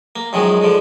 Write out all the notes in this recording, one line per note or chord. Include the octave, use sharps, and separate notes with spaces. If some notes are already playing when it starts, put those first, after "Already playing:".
A#3
F#2 D#3 F3 G#3
G#2 D3 F3